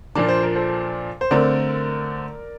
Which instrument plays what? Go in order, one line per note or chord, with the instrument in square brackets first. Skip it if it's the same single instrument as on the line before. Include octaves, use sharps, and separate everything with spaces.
[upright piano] A#2 F3 A#3 D4 D5
C5
A#4
A4 C5
C5
D3 A3 C4 A#4 D5